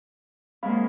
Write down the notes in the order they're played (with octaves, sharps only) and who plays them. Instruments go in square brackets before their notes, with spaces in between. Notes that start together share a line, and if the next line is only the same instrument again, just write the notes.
[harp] F#2 G#3 A#3 [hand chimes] C4 F5 B5